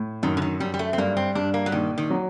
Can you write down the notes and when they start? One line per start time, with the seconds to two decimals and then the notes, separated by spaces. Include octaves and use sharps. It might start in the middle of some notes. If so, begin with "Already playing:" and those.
Already playing: A2
0.23 F#2 D#3
0.37 D3
0.42 D#3
0.60 F#2 G3
0.74 G3
0.79 A3
0.93 C4
0.98 G2 A#3
1.17 C4
1.35 G2 D4
1.54 A#3
1.66 F#3
1.72 A#1 D#3
1.98 D#3
2.10 F#3